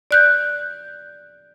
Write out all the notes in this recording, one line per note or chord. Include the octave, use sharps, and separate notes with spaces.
D5 F#6 G6